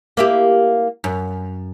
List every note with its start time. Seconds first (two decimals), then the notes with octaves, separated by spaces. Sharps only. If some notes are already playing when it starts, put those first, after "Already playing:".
0.17 A#3 E4 G4
1.04 F#2